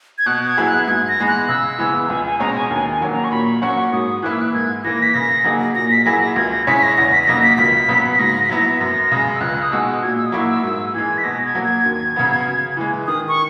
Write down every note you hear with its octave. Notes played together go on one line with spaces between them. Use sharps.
G#6
B2 F#6
G#6
F#3 B3 E4 G#4
F#6
G#2 G#6
A#6
E3 G#3 B3
F#6
C#3 E6
E3 G#3 B3
A#5
C#2 G#5
G#5
B2 G#3 C#4 A#5
G#5
D#2 G#5
G#5
D#3 F#3 A#3 C#4
A#5
C#6
A#2 B5
F#3 A#3 C#4 F#4 C#6
G#2 D#6
E3 A#3 E4 F#6
E6
F#6
G#2 G#6
E3 A#3 A#6
B6
C#3 A#6
F#3 A#3 D#4 G#4
A#2 A#6
B6
F#3 A#3 E4 G#4 A#6
A#6
C#2 G#6
A#6
C#3 G#3 C#4 E4 B6
B6
A#6
E2 A#6
B6
B6
C#3 F#3 A#3 D#4 A#6
B6
C#2 B6
C#3 F#3 B3 F#4
B6
G#2 A#6
B6
F#3 B3 E4 A#6
F#2 A#6
C#3 G#3
E6
C#2 F#6
D#6
B2 G#3 D#4 F#4 E6
A#2 G#6
E6
D#6
F#3 A#3 E4 C#6
E6
G#2 E6
E3 G#3 G#6
B6
B2 A#6
G#6
F#3 A#3
G#6
D#2
C#3 F#3 B3
C#3
E3 G#3
D#3 D#6
C#6